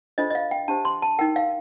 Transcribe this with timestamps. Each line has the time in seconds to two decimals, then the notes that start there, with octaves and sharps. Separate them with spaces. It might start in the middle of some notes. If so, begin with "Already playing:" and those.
0.18 D4 F4 A4 C5 D#5
0.30 D#5
0.35 F5
0.51 G5
0.68 D4 G4 C5 A5
0.85 C6
1.02 A5
1.19 D#4 A#4 G5
1.36 F5